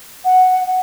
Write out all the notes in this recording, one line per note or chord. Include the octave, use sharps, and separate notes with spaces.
F#5